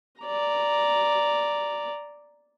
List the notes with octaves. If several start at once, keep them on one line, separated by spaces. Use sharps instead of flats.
D5 A#5